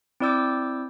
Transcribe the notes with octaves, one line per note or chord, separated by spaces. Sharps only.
C4 E4 D5 D6 E6 G6